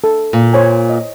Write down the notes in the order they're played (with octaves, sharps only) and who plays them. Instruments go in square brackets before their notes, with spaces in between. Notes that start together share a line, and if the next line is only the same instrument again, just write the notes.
[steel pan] A4
[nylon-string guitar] A#2
[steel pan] C5 C#5 G#5
D#5